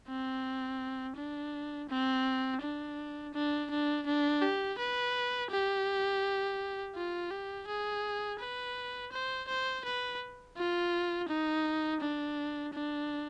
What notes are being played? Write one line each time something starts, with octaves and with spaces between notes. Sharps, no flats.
C4
D4
C4
D4
D4
D4
D4
G4
B4
G4
F4
G4
G#4
B4
C5
C5
B4
F4
D#4
D4
D4